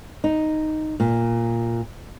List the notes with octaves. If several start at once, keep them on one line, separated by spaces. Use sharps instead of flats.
D#4
A#2